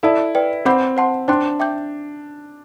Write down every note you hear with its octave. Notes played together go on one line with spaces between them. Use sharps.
E4 A4 D5 A5
B4 D5 G5
C4 F#5 B5 D6 G6
C5 F#5 A5 C6
D4 C5 G5 C6 F#6
E5 G5 D6 G6